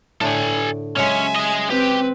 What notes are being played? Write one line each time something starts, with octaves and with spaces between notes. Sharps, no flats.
A2 D3 A4 G5 G#5
C#3 F#3 G#3 C#4 E5 G#5
G#4 D#5
C4 G4 B4